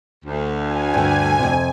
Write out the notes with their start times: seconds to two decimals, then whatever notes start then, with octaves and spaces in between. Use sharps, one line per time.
0.25 D2
0.59 G#5
0.94 G2 D3
1.39 F2 C3